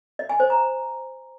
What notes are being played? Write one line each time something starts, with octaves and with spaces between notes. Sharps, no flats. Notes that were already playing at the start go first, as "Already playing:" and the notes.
D#5
G#5
C5
A#5